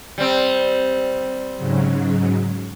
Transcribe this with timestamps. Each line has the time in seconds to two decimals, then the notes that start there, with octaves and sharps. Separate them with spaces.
0.18 G3 C4
1.56 G#2 C#3 F#3